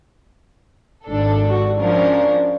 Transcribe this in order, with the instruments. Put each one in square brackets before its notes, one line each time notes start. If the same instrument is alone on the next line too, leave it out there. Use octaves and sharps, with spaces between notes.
[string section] G#1 D4 A4
[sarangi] F#4
[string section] F3 C#4 A#4 [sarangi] D4